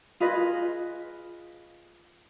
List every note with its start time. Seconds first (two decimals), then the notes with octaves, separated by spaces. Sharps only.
0.20 F4 G#4 B4 D#5